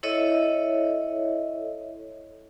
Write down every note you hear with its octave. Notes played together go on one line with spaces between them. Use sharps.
E4 A4 C#5 D#5 E5